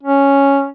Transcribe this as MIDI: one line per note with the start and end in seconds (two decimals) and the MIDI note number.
0.03 0.68 61